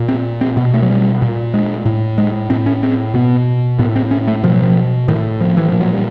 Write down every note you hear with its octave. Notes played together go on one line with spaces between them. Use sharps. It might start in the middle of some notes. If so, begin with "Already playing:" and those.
Already playing: A#2
C4
C4
B2 B3
A3
F#3
G3
A#2
G#3
A2
G#3
A2 C4
C#4
C4
B2 B3
A2 B3
C4
C#4
A3
B2 F3
F#3
F3
A2 D#3
F3
E3
A#2 F3
F#3
G3